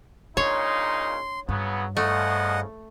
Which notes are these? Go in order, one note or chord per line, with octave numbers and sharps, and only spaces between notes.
A#2 C#3 D4 D#4 C#5 C6
G2 C#3 F#3 B3
E2 C#3 F3 A3 D#5 F#5